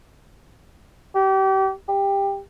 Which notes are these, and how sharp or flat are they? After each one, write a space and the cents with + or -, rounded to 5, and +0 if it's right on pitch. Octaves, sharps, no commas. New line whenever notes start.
G4 -30
G4 +15